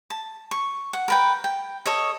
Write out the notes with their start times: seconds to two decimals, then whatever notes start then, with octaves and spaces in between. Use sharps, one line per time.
0.10 A5
0.51 C#6
0.93 F#5
1.08 A#4 B4 G5
1.44 G5
1.86 A4 C#5 D#5